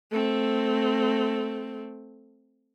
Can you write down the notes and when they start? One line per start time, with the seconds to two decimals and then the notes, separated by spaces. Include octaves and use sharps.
0.12 A3 C4